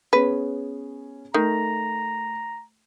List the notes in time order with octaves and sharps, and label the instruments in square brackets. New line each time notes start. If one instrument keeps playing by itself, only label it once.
[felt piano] B3 C#4 G#4 [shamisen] B4
[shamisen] D#3 [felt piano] A3 [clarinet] A#5